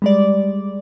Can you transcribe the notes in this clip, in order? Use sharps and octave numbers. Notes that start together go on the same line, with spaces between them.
G3 G#3 D5